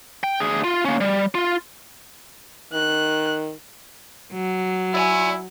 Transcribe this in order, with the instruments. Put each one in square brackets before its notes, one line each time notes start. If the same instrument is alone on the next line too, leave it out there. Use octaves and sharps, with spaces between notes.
[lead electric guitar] G5
D2 G#4
F4
A#3 C#4
G3
F4
[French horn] D#3 [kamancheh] F#6
[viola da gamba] F#3
[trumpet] E4 [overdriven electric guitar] D5 G#5